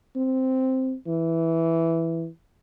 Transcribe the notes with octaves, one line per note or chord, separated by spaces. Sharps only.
C4
E3